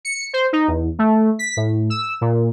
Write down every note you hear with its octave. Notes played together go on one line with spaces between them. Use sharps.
C#7
C5
D#4
E2
A3
B6
A2
E6
A#2